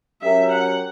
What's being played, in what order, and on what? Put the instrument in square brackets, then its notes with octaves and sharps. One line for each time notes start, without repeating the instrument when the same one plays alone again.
[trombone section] F#3 C#4 G4 A#4 [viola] E5
[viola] F#5